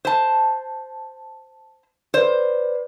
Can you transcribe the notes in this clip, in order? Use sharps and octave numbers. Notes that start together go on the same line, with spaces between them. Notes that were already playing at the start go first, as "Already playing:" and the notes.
C5 A5
B4 C5 D5